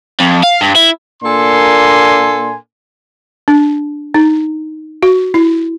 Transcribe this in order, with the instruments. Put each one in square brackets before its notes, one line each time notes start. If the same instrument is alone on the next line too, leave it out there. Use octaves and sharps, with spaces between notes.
[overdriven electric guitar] F2
F5
G2
E4
[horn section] A#2 A#3 D4 A4 G#5 C6
[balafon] D4
D#4
F#4
E4